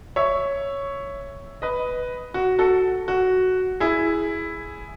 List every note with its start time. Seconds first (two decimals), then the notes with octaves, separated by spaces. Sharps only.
0.16 C#5 E5
1.62 B4 D#5
2.34 F#4
2.59 F#4 A4
3.08 F#4
3.80 E4 G#4